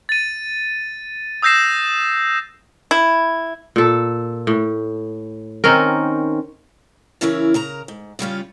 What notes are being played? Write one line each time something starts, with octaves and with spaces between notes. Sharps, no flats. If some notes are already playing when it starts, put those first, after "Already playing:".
A6 D#7
D#6 E6 G6 A#6 C7 E7
E4
A#2 A4
A2
D#3 C4 C#4 A#4
C#3 E3 C#4 E4 A#4
C#3 A#4 A#5
G#2
C#3 G3 C#4 F4